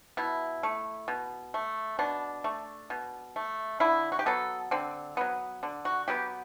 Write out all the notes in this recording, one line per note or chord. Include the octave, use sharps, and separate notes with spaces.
B2 E4
A3
B2
A3
B2 D4
A3
B2
A3
D3 E4
F#4
G4
F#3 B3 A4
D3 C4
F#3 B3
D3
F#4
F#3 B3 G4